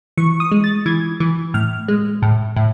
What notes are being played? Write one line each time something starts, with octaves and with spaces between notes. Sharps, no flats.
E3 C#6
D#6
G#3
A6
E3 G#6
E3
A2 F6
G#3
A2
A2